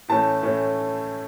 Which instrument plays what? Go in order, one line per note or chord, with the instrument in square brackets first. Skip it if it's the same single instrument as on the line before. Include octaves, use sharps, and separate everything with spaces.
[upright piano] A2 E3 A3 C#4 A5
A2 E3 A3 C#4